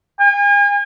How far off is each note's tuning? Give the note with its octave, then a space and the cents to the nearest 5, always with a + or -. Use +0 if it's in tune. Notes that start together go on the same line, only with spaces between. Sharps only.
G#5 -40